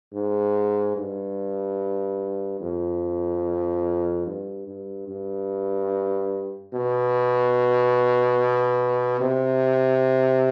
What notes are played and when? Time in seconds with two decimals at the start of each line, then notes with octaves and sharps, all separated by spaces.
0.13 G#2
0.97 G2
2.61 F2
4.26 G2
4.68 G2
5.08 G2
6.73 B2
9.21 C3